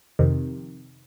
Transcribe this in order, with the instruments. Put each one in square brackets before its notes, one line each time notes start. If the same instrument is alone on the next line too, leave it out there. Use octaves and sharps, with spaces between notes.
[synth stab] F2 C3 D#3